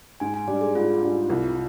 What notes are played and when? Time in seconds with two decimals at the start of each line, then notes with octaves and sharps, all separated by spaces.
0.20 G#2 G#5
0.34 G#5
0.47 G3 D4 D5
0.61 G#4
0.75 G#2 F4
1.03 G3 D4
1.30 C2